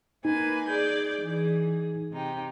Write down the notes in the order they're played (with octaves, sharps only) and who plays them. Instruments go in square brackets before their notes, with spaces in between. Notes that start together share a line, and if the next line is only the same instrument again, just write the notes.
[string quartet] A#3 B4 G#5 [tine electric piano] D#4
[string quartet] G#4 D5 G6
E3 G#4
C3 D#4 G4